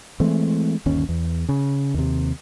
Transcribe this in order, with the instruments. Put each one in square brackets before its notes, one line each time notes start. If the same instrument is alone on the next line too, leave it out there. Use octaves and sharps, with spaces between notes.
[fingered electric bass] E3 G#3 A3 C4
G1 D#2 C#4
E2
C#3
D#2 C3